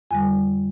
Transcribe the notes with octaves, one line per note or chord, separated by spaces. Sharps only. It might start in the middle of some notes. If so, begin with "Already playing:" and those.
F2 D3 G3 G#5